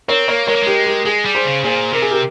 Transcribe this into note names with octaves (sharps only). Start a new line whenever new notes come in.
C4 A#4 C#5
A#3 A#4 C#5
G#3 A#4 C#5
A#3
G#3 G4 A#4
G4 A#4
G#3 G#4
G3
G#4 C5
C#3
A#2 G#4 C5
C3 A#4
G#4
G4 A#4